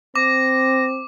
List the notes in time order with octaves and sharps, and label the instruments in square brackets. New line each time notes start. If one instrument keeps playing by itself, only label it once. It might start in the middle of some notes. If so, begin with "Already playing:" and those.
[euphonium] C4 [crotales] D6 [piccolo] A#6